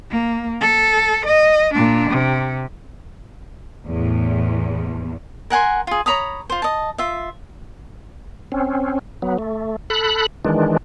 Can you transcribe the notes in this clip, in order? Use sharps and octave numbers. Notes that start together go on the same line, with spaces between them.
A#3
A4
D#5
A#2 D4
C3
E2 A2
A#4 F#5 G#5 C6
F4 G#4
C#5 A#5 B5 D#6
F4 C5
D#5 A5
F4 E5
C4 C#4
F#3 B3
A3
A4 B5 F#6
D#3 E3 G#3 D4